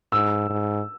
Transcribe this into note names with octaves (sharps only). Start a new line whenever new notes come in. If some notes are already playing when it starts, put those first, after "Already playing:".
G#2 E6
G#2